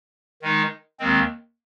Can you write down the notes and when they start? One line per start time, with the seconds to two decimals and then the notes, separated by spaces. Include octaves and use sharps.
0.42 D#3 G#3 D#4
0.99 D#2 D#3 G#3 C4